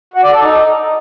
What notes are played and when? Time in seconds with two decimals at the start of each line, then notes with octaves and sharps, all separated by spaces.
0.14 F#4
0.23 D5
0.32 A4
0.41 D#4